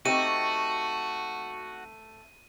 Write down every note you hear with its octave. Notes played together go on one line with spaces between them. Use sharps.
A3 C4 D#4 F#4 G4 D#7